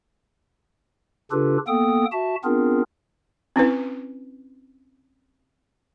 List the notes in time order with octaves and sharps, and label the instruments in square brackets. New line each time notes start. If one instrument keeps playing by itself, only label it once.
[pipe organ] C#3 D4 F4 G4 A4 B4
A#3 B3 A4 G5 D#6
F#4 E5 A5
B3 C4 D4 F4 G#4 A#4
[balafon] C4 C#4 E4 B4